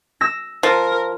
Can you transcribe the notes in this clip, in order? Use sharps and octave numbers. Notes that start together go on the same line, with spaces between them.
E6 A#6
F3 A#4